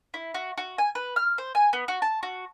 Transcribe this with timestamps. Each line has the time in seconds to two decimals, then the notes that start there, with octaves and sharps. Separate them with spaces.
0.14 E4
0.34 F#4
0.58 F#4
0.78 G#5
0.95 B4
1.16 F6
1.38 C5
1.55 G#5
1.73 B3
1.88 F#4
2.02 A5
2.23 F#4